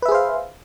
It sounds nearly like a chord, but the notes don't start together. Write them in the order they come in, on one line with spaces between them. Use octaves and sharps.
B4 E5 G#4 C5 F5